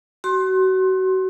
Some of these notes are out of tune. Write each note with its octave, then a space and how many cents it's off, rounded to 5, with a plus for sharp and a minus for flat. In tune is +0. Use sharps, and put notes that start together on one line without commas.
F#4 +30 C6 +20